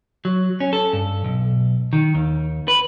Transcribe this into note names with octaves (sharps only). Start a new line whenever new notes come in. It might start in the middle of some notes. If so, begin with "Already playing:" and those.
F#3
C#4
A4
G2
B1
D#3
D#2
B4